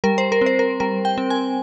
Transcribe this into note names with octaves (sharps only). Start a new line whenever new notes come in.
G3 A#4
C5
A#4
C4
C5
A#4
G3 A#4
G5
C4
G#5